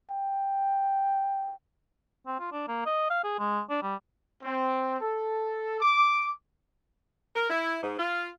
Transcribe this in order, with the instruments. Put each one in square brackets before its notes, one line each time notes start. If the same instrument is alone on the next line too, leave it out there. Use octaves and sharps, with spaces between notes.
[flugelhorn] G5
[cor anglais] C4
F4
D4
A#3
D#5
F5
G#4
G#3
D4
G3
[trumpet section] C4
A4
D6
[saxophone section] A#4
E4
G#2
F4